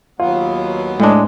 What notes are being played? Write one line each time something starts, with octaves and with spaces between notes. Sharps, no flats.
D#2 F#3 B3 F4
A2 G#3 D4